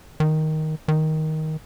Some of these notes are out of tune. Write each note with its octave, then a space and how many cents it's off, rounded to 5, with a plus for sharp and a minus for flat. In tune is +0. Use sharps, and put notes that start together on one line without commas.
D#3 +5
D#3 +10